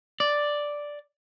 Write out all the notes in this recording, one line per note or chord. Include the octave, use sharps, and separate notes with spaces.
D5